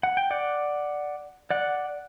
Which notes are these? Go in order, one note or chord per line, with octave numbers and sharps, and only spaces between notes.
F#5
G5
D5 F#5
D5 F#5